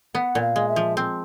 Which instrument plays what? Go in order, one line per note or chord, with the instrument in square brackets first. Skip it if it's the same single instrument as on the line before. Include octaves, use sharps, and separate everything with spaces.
[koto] B3 [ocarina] F#5
[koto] A#2
[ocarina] F5
[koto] G#3
[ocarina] E5
[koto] F3
C4